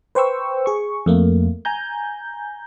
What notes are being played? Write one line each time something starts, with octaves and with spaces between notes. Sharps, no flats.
B4 C5 G5 C#6 E6
G#4 C#6
F2 A3 A#3
G#5 A#5 G6